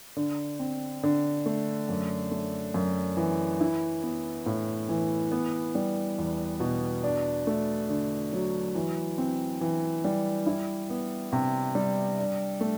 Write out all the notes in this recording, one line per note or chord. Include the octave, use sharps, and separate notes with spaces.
D3
C4
D3
A3
F#2
A3
F#2
E3
E4
B3
A2
E3
B3
G3
E2
B2
D4
A3
D3
F#3
E3
C4
E3
G3
E4
B3
C3
G3
D4
A3